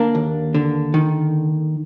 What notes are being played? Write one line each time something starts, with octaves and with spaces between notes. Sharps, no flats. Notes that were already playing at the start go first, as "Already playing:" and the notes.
Already playing: D3 A#3 D4
D#2
D3
D#3